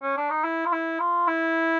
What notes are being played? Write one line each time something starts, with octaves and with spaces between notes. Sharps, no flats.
C#4
D4
D#4
E4
F4
E4
F4
E4